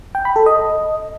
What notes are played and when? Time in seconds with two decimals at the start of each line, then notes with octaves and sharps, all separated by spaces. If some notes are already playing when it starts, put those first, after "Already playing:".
0.15 G5
0.25 B5
0.36 A4
0.46 D#5